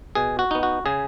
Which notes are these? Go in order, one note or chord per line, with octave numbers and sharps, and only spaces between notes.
B2 G#4
F#4
B3 D#4
F#4
C#3 G#4